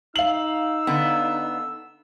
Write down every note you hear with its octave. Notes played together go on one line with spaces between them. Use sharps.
D#4 F5 E6 F#7
D3 B3